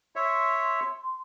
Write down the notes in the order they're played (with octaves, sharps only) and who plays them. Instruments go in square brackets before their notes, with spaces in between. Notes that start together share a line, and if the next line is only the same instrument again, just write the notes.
[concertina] C#5 E5 [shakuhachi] C6